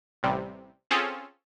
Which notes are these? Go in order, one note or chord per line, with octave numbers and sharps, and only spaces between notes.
A1 C3 G3
C4 C#4 F4 G#4 A4